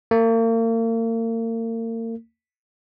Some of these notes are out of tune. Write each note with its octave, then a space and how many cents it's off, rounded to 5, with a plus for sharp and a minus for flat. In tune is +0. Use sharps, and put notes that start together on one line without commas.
A#3 -40